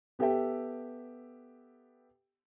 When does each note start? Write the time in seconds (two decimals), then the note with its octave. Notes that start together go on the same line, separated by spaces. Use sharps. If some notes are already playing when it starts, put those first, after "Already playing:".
0.19 B3 G4 A4 E5 G5